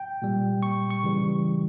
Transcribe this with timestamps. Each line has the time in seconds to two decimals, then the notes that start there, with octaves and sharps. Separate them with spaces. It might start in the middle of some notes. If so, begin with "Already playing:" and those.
Already playing: G5
0.22 A#2 G3
0.63 C#6
0.90 C#6
1.03 C#3 E3 G3